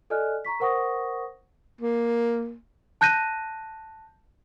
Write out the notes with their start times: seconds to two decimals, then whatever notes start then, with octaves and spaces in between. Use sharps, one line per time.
0.10 A4 D5 D#5 G#5 F6 F#6
0.45 A#5 C#6 B6
0.60 A#4 C5 F#5 C#6 D#6 A#6
1.81 A#3
3.01 A5 F#6 G6 A#6 D#7